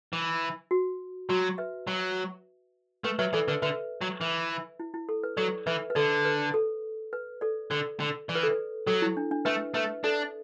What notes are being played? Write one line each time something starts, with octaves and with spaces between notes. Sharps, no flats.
E3
F#4
F#3 F#4
B4 E5
F#3
A3 B4
F#3 B4 E5
E3 A4 D5
D3 B4
D3 B4 E5
F#3
E3 B4 E5
E4
E4
A4
B4
F#3 A4 D5
E3 B4 E5
B4
D3 A4 D5
B4
A4
B4
A4 D5
D3 A4 D5
D3
E3 D5
B4
A4
B4
F#3 A4
E4
D4
D4
A3 B4 E5
A3 B4 E5
D4 A4 D5